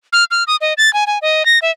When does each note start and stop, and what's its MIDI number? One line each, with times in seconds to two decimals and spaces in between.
0.13 0.24 89
0.31 0.44 89
0.47 0.56 87
0.61 0.73 75
0.78 0.92 93
0.93 1.04 80
1.07 1.18 80
1.22 1.46 75
1.46 1.59 94
1.62 1.71 76